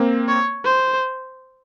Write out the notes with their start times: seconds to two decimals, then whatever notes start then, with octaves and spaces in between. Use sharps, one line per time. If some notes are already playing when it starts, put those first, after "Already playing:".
Already playing: A#3 C4
0.28 C#5
0.65 C5